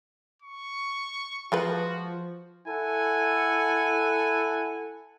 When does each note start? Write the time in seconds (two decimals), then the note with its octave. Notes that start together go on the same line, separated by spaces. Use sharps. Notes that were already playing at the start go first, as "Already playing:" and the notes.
0.42 C#6
1.52 F3 G#3 F4 F#4 B4
2.67 E4 A4 F#5 G#5